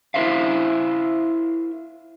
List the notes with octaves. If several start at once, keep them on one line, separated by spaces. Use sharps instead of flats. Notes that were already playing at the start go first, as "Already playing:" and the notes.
E4 G4 A#4 C5 E5 F5